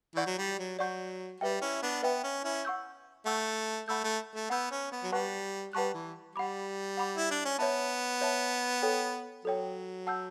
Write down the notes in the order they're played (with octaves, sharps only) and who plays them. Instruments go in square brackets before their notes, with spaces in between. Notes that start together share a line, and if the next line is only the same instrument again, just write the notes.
[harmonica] E3 [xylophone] D5 F#5 C#6 G6
[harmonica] F#3
G3
F#3
[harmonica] F#3 [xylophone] D5 F#5 C#6 G6
[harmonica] G3 [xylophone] B4 E5 G5
[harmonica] C#4 E4
B3 D4
[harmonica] B3 [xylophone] B4 E5 G5
[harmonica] C#4
C#4 E4
[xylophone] F#5 C#6 E6 G6
[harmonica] A3 [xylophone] F#5 C#6 E6 G6
[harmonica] A3 [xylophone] F#5 B5 E6 G6
[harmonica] A3
A3
[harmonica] B3 [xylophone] F#5 B5 E6 G6
[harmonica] C#4
B3
F#3
[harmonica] G3 [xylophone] B4 F#5 A5 C#6 F#6
[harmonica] G3 [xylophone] B4 F#5 A5 C#6 F#6
[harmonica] E3
[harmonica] G3 [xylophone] F#5 B5 D6
[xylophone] F#5 B5 D6
[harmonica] E4
D4
C#4
[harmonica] B3 [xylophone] C#5 E5 A5
[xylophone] C#5 E5 A5
A4 C#5 G5
[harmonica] F#3 [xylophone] A4 C#5 G5
[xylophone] F#5 A5 E6 G6